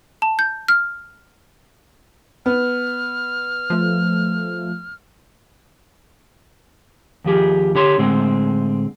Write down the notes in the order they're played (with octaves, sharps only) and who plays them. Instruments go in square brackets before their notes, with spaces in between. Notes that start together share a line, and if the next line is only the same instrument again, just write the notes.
[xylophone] A5
G6
F6
[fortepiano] B3 [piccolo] F6
[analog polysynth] F3 A3
[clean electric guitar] D#2 F3 G4 G#4
D3 G4 C#5 C6
A2 D3 G#3 C4